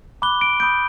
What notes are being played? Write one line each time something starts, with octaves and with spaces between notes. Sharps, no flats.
B5 D6 F#6 G7
D7
B5 D#6 G6 D7